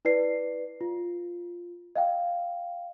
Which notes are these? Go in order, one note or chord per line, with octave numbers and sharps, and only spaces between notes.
E4 B4 D5 C7
F4
D#5 F5 G5